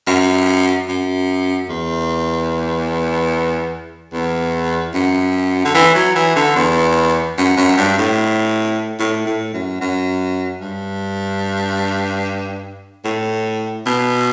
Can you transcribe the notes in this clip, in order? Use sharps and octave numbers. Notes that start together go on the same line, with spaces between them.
F#2
F#2
E2
E2
F#2
D3
E3
F#3
E3
D3
E2
F#2
F#2
G2
A2
A2
A2
F#2
F#2
G2
A2
B2